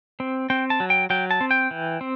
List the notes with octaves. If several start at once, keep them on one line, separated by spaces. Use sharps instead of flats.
C4
C4 G5
A5
F#3
G5
F#3 G5
A5
C4
G5
E3
C4